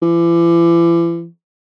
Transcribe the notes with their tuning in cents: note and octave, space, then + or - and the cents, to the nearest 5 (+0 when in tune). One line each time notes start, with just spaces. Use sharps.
E3 +40